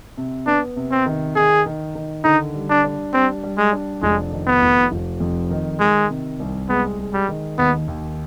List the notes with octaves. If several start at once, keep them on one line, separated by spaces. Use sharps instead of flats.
C3
B3 D4
C3
C4
D#3
D#3 G#4
D#3
D#3
D3 D#4
G3
D4
D4
G3 C4
G3
G#3
D4
F1 G#3
D#3
B3
F1
F1
F2
D#3
D#3 G#3
C3
C2
G#3 B3
G#3
G3
D#3
D#2 B3
D#2